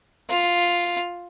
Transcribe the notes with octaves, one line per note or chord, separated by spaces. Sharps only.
F4